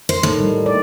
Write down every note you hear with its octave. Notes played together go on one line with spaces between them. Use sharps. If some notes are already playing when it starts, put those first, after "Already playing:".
C5
A2 D#3
G3
D5